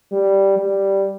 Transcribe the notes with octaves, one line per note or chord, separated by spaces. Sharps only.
G3
G3